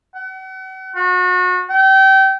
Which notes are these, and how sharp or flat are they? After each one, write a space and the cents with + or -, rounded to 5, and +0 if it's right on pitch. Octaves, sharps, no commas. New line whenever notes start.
F#5 +40
F#4 -35
G5 -30